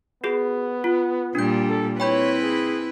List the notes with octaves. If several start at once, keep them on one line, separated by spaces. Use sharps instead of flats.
B3 F#4 G#4
F4
A#2 G3 D4 G6
A4
C4 E4 B4 C#5 G5 B5 G6
G#4